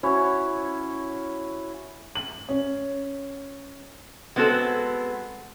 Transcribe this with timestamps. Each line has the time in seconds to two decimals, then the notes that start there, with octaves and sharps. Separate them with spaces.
0.03 C#4 E4 F#4 C#5
2.15 F#7
2.49 C#4
4.36 G#3 B3 C4 F#4 A4